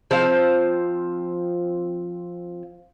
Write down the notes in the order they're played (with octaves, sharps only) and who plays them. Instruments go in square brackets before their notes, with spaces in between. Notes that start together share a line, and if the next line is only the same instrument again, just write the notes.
[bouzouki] F3 C4 C5 F5